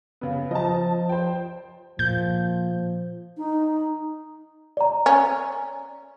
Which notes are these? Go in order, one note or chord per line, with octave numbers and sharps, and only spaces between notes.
C#3 B3
F3 D#5 A5
C5 G5
A#2 F3 G6
D#4
D5 A#5
C#4